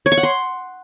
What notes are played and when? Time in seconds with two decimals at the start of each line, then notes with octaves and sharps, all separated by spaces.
0.06 C#5
0.12 C#6
0.17 F#5
0.23 C6